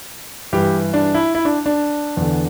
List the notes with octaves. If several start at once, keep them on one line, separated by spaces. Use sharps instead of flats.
G2 E3 G4
D4
E4
E4
D4
D4
E2
D3